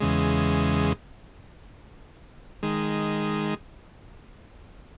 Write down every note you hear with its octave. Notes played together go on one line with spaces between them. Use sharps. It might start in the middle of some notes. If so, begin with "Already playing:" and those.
E2 C#3 G#3
D#3 G#3